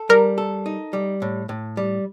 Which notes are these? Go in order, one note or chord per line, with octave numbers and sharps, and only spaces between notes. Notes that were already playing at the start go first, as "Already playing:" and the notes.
Already playing: A4
G3 A#4
A4
D#4
G3
A2
A2
G3